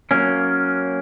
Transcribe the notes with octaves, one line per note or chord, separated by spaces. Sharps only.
F#3 A#3 C#4